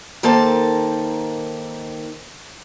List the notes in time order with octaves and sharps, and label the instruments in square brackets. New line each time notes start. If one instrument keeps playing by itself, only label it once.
[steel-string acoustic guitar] D#3 A#3 A4 C5 A5